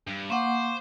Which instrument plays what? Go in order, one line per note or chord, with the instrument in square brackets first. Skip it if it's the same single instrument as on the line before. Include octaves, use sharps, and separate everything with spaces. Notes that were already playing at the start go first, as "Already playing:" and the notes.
[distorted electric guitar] G2
[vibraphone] A#3 F#5 [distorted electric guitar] C5 [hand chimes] F5 C#6 D6